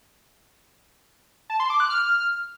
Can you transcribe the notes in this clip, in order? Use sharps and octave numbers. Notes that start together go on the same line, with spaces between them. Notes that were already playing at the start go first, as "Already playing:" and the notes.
A5
C6
D6
F#6
F6